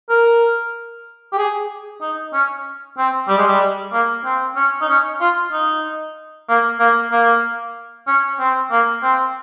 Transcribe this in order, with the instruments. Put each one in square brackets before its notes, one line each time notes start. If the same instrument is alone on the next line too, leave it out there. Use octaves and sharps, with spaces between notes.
[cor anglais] A#4
G4
G#4
D#4
C#4
C4
G3
G#3
G3
A#3
C4
C#4
D#4
C#4
F4
D#4
A#3
A#3
A#3
C#4
C4
A#3
C4